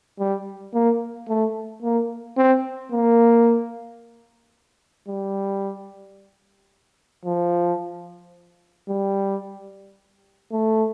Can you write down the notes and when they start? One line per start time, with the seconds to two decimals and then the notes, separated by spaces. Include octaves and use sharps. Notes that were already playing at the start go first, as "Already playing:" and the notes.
0.20 G3
0.74 A#3
1.29 A3
1.83 A#3
2.37 C4
2.92 A#3
5.08 G3
7.26 F3
8.89 G3
10.52 A3